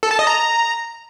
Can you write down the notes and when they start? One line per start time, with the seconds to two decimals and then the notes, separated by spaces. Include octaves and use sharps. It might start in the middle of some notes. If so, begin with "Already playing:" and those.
0.03 A4
0.11 A5
0.19 D#5
0.27 A#5